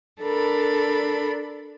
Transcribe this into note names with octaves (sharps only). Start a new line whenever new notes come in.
D4 A4 A#4 B5